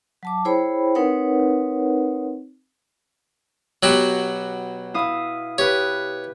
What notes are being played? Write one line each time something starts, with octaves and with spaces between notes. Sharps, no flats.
F#3 A5 D6
E4 G#4 C5 C#5 G5 B5
C4 D#4 A#4 B4 C#5 F#5
B2 F#3 F#4 G4
E4 F5 D#6
G4 B4 C#5